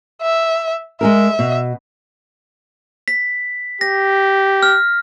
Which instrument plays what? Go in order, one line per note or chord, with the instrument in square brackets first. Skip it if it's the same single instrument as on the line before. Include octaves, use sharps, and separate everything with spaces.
[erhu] E5
[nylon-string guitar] G#3 G#4 A#4 [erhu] E5
[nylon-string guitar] B2
[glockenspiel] B6
[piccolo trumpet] G4 [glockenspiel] A#6
[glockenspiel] F6